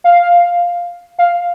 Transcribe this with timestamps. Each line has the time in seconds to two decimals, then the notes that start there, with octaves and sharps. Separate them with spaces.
0.04 F5
1.19 F5